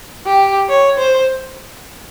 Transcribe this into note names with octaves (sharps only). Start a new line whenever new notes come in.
G4
C#5
C5